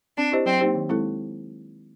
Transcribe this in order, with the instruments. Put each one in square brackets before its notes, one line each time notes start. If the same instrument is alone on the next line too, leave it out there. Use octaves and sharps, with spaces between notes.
[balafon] C4 [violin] D4
[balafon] E4 G4 C5 D#5
[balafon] F#3 [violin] C4
[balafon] A#3 D#4 G4 C5
D#3
G#3 C4 E4 A4